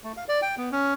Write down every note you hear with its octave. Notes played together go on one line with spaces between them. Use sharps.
A3
F5
D5
G5
B3
C#4